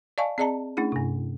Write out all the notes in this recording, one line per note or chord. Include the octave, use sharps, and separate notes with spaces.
D5 D#5 F5 G#5 A5 C#6
C4 G#4 D5 D#5 A5 A#5
A3 C#4 D4 E4 G#4
G2 C3